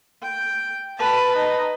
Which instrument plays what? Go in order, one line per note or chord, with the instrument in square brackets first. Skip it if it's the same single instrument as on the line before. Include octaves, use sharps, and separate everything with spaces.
[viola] G5
[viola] B4 [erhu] A5
[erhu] D#4